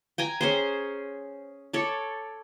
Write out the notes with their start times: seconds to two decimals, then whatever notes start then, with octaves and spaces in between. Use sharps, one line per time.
0.18 G5 G#5 A#5
0.41 C#4 G#4 C5
1.73 A4 C#5 D5